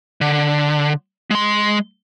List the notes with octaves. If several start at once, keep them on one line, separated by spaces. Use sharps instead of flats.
D3
G#3 C6